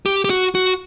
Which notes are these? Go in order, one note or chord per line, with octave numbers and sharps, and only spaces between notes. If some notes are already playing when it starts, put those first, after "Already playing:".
G4
G4
F#4
F#4